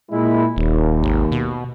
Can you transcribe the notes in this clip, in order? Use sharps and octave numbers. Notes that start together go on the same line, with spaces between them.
A#2 G#3 E4
D#1 D#2
G#1
B2